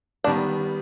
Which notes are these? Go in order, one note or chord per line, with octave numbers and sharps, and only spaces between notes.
D#3 G3 B3 D4